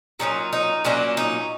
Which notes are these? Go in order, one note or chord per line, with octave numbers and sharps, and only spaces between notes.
A#2 F#3 A#3 C#4 D#4
D#4
A#2 F#3 A#3 C#4 D4
D#4